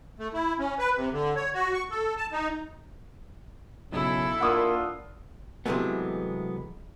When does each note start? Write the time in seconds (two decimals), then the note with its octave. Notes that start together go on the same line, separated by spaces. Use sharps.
0.19 A3
0.33 E4
0.59 C#4
0.79 B4
0.97 C3
1.12 D3
1.36 C#5
1.54 F#4
1.73 C#6
1.90 A4
2.17 A5
2.32 D#4
3.92 B1 C#3 E4 A4
4.40 A#3 D4 F4 F#5 D#6 E6
5.66 C3 E3 F#3 G#3 A3 B3